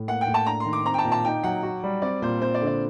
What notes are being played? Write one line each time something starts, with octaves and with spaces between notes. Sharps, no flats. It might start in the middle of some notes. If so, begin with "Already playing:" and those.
Already playing: A2
A#3 F#5
G5
A2
A5
D4 A#5
C6
D#3
D6
C4 A#5
G5
A5
A#2
A5
D#4 G5
F#3 F#5
F#4
G3
C4 D5
A#2 C5
C4 C5
D5
D3
D5